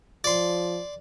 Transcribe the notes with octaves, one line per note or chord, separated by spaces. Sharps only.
F3 D5 C6